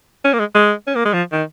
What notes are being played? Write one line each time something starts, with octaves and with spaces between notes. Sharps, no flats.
C#4
A#3
G#3
G#3
C#4
A#3
G#3
F3
D#3